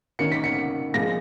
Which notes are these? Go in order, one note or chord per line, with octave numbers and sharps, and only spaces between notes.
D#3 A#3 C#4 C#7
B6
C#7
A#2 F3 G#3 A#6